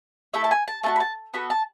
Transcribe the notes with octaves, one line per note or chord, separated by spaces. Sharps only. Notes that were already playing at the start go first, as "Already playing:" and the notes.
A3 E4 A4 E5
A5
G#5
A5
A3 D#4 F#4 A5
B5
A5
B3 F#4 A4 B5
A5